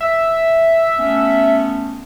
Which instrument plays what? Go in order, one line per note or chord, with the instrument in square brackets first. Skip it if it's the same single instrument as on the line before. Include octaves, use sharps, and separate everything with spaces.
[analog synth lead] E5
[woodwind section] A3 B3 C#4